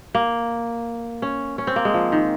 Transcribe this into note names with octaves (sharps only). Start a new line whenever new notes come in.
A#3
C#4
C#4
C4
A#3
G#3
F3
D#3